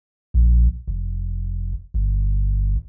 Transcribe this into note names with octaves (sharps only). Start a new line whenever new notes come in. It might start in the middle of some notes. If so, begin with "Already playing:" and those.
A#1
F1
G1